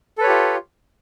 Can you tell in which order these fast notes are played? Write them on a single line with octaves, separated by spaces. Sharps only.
A4 B4 C#5 G4 F4